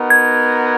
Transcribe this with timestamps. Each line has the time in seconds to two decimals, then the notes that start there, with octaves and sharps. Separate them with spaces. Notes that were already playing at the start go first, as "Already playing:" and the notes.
Already playing: B3 D#4 F#4 A#4
0.10 G#6